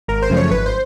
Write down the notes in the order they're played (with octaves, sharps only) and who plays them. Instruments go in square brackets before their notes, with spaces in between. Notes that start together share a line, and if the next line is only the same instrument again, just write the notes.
[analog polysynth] G#1 A#4
C5
F#2 C#3 F3 A3
C#5
G#1 B4
C5